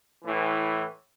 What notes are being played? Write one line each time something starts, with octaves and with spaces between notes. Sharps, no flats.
A2 E3